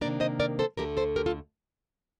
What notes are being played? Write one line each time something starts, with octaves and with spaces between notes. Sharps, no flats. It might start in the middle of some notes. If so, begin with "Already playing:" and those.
C3 D#3 A#3 D4 A#4 D5
C5 D#5
A#4 D5
A4 C5
D2 D3 F3 A3 G4 A#4
A4 C5
G4 A#4
F4 A4